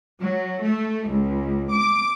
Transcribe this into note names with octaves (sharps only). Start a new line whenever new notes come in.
F#3
A3
C#2
D6